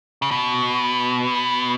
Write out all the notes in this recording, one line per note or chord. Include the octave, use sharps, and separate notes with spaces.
C#3
B2